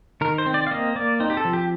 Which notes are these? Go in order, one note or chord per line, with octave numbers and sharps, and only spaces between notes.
D#3 A#4
C5
C4
D5
F5
A#3 D#5
A#3 D5
C4 D#4
G4
A4
F3
G4